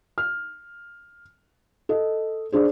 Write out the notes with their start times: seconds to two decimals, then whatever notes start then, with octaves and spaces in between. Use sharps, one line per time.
0.18 F6
1.89 A4 D#5
2.52 D4 G#4 C5